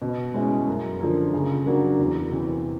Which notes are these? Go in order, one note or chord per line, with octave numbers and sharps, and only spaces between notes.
B2
G#3 C#4 E4
F#2
D3 F3 A#3
C#3
F#3 A#3 D4 F#4
E2
C3 E3